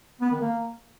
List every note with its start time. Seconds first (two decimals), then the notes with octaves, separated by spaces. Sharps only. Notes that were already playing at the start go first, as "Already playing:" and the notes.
0.21 B3
0.31 D#3
0.41 A#3